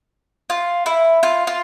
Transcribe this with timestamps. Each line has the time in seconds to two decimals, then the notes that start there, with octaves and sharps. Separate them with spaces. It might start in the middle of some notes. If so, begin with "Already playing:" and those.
0.50 F4
0.86 E4
1.23 F4
1.47 F4